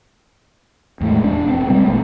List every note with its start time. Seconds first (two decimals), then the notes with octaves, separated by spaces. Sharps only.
1.01 E2 A2 G#3 A3
1.23 E1 D4
1.45 F1 B3 C4
1.69 B2 G3 G#3 B3
1.86 A#1 A3